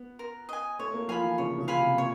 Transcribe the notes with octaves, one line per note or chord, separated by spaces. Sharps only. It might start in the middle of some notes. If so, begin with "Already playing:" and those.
Already playing: B3
A#4
D#5 G#5
A3 C#5
A#3
F3 F5 G#5 B5
E3
C#3 C#5
C#3
F5 G#5 B5
C3
A#2 C#5